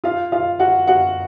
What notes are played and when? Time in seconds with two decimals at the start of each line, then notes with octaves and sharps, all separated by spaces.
0.04 F4 F5
0.32 F4 F5
0.59 F#4 F#5
0.87 F#4 F#5